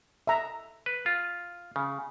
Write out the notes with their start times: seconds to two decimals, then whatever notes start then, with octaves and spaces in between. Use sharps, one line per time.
0.27 E5 A#5
0.86 B4
1.06 F4
1.76 C#3